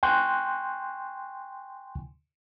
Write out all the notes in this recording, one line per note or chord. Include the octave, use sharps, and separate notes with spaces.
G5 G#5 C6 C#6 F#6 G6